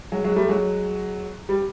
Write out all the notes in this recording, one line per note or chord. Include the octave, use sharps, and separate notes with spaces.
F#3 G#3
F#3 G#3
G3 A3
F#3 G#3
G3